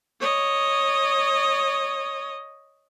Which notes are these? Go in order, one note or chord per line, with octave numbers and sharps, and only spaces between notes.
C#5 D#5